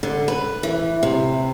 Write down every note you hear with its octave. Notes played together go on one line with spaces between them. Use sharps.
D3
B4
E3
C3